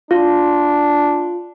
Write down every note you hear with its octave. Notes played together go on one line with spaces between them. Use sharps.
D4 F4